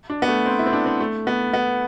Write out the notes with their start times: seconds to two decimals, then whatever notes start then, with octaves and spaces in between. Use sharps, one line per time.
0.10 D4
0.22 B3
0.28 A3
0.46 C4
0.59 E4
0.66 C4
0.73 D4
0.86 C4
1.00 A3
1.27 B3
1.53 B3